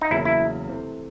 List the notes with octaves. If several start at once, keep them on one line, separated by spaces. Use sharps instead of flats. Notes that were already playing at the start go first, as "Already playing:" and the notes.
D#4
E2 C#3 F#3 A#3 E4
E4
C3 E3 A3 C4